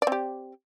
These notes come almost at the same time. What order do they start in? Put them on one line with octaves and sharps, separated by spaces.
D5 C4 G4